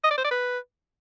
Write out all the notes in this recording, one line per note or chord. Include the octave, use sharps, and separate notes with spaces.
D#5
D5
C5
D5
B4